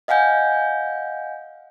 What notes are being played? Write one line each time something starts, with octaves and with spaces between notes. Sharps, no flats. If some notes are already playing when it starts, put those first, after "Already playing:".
D#5 F5 F#5 G#5 G6